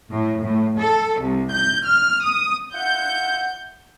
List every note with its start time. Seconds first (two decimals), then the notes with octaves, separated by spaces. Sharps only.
0.11 A2
0.44 A2
0.79 A4
1.20 C2
1.51 G6
1.86 F6
2.23 D#6
2.75 F4 E5 F#5 G6